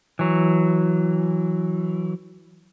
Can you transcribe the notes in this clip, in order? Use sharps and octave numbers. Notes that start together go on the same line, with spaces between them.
E3 F#3